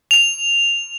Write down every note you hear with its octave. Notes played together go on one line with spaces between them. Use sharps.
F7